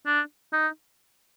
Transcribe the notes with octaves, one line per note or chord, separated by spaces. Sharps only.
D4
D#4